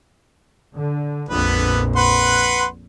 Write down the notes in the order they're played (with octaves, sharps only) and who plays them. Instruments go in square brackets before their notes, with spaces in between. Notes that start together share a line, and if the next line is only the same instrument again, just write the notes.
[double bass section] D3
[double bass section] A#1 F2 A#2 [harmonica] D3 B3 B4
[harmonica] B4 F#5 C6